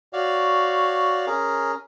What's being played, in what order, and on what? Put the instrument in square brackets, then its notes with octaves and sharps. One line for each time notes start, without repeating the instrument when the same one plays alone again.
[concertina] F#4 C#5 D5 F5
C#4 G#4 A#4